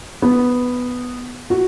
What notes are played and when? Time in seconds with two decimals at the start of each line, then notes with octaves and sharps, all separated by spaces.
0.22 B3
1.50 F#4